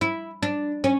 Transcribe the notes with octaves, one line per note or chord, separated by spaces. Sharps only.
E4
D4
C#4